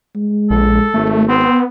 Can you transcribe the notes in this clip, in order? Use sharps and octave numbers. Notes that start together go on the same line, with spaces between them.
G#3
A#1 A4
G#1 A3
B3 C4